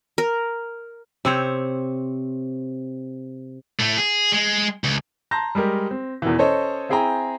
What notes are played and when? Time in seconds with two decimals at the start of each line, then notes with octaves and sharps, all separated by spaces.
0.18 A#4
1.25 C3 C4 C#5
3.79 A2 A3
3.97 G#4
4.32 G#3
4.84 C#2
5.31 A5 A#5 C6 G6 A#6
5.55 G3 G#3 G4 A#4
5.91 C4
6.22 E2 B2 D#3 E3
6.38 C#4 A4 C5 C#5 D#5
6.89 C4 E4 G#4 G5 G#5 A#5